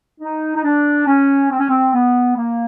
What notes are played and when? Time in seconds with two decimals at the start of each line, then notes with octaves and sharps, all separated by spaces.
0.20 D#4
0.55 D#4
0.63 D4
1.07 C#4
1.50 C4
1.59 C#4
1.68 C4
1.93 B3
2.36 A#3